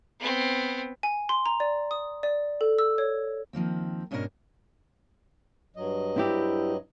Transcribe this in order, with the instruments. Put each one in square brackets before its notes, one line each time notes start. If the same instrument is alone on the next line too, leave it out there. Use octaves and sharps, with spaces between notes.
[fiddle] B3 C4
[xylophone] G#5
C6
A#5
D5
D#6
D5
A4
E6
C#5
[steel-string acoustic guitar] D#3 F3 A#3 C4
G#2 B2 C#4 D4 E4 A#4
[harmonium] G2 F#3 D#5
[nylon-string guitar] C4 E4 G4